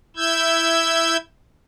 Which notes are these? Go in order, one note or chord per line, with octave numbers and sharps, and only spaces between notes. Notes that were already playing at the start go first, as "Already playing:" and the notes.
E4 E6 G6 G#6